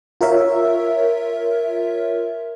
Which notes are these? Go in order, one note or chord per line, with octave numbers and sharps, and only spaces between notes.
F4 A#4 C#5 E5